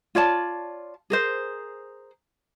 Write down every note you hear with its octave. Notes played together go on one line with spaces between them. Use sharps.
F4 C#5 D5 A5
G#4 A#4 C5